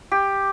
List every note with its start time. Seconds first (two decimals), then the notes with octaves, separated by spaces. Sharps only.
0.12 G4